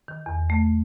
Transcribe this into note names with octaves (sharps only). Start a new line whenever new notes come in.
D#3
E2
A3